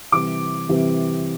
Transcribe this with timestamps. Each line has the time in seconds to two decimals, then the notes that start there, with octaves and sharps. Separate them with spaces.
0.12 C3 E3 G3 D6
0.69 C3 E3 G3